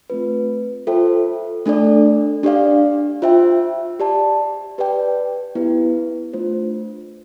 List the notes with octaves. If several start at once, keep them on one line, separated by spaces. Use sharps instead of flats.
A3 C4 F4 B4
F4 A4 C5 E5 G5
A3 D4 A4 D5
D4 G4 D5 F5
F4 C5 E5 G5
G4 D5 A5
G4 B4 D5 G5
B3 E4 G4 B4
A3 D4 F4 C5